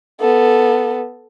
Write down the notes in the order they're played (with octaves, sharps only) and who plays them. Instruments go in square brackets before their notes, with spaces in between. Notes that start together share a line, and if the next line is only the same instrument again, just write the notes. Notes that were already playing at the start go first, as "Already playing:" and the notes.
[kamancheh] B3 A4